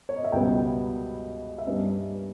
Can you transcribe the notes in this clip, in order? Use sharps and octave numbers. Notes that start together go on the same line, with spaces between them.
C#5
D#5
E5
C#2 B2 G3 B3 D#5 G5
E5
G2 G3 A#3 C#4 B4 D#5